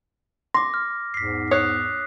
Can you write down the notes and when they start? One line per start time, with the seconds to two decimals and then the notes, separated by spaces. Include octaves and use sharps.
0.54 C6 D6 A#6
0.74 F6
1.14 E2 G#2 B6 C7
1.51 C#5 D#6 F#6 C7